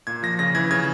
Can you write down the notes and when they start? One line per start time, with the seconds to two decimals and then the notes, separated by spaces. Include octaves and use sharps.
0.07 A#2 G#6
0.23 F3 A#6
0.39 C#3 A#6
0.55 E3 G#6
0.71 C#3 G#6